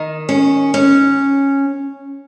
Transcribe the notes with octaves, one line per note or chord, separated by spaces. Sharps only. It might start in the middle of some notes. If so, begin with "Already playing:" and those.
Already playing: D#3
C#4
C#4